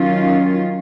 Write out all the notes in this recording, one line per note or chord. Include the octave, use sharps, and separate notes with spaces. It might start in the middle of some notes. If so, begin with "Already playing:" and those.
Already playing: D#3 F#3 C#4 F4